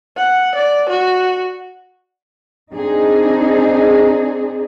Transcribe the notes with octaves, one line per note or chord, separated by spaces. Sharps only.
F#5
D5
F#4
C4 D4 D#4 G#4